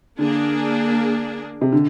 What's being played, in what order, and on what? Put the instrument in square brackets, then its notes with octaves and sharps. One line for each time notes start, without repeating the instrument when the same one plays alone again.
[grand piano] D3 [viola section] A#3 D4 G#4
[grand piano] C3
D3